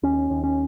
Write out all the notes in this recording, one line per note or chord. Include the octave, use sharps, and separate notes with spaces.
D#2 C#4
D#2
C#4